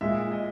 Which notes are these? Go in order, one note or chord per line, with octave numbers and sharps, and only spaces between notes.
A#2 G#3 E5
D#5